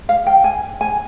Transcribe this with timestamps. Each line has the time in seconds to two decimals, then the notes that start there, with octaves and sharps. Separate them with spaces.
0.09 F5
0.27 G5
0.44 G#5
0.81 G#5